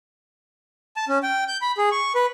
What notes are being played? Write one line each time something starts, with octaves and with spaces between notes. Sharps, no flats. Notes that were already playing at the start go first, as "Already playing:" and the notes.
A5
C#4
G5
G6
B5
G#4
C#6
B4